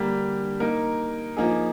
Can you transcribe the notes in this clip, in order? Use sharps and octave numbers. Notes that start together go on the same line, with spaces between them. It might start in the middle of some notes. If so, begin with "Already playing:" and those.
Already playing: D3 G3 A#3 D4 G4
A#3 D#4 A#4
F3 A#3 D#4 G#4